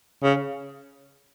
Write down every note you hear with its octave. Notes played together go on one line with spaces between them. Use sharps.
C#3